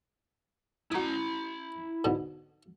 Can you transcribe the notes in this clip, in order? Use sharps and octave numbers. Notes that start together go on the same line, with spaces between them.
E4 F#4 A#5 D#6
G#2 B2 D3